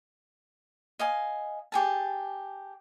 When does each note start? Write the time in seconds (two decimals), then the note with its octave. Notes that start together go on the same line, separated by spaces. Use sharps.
0.99 D#5 F5 G#5
1.72 G4 G#4 A5